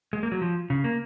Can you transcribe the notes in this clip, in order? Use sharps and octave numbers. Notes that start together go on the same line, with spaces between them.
G#3
A#3
F#3
F3
C#3
A#3